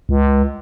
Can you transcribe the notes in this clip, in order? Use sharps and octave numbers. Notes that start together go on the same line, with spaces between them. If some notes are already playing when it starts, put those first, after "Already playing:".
C#2